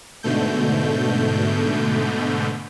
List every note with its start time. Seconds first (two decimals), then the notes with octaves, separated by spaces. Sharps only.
0.23 G#2 B2 D3 A3 G6